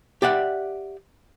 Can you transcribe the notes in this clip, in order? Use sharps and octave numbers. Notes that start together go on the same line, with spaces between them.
G4 D5 E5 F#5